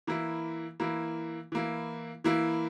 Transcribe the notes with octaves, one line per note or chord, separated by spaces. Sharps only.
E3 A#3 E4
E3 A#3 E4
E3 A#3 E4
E3 A#3 E4